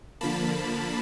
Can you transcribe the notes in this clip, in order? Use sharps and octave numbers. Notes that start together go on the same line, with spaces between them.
D3 F3 A#3 A5 B5